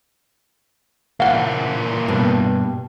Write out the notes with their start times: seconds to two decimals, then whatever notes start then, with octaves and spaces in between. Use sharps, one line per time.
1.20 A#2 E3 A#3 E4 F5 F#5
2.08 G2 B2